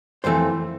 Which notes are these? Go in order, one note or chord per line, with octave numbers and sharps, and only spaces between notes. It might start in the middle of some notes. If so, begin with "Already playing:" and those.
F2 E3 A3 C4 C5